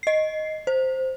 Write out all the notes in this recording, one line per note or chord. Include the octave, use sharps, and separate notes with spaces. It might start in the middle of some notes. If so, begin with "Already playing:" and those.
D#5 C7
C5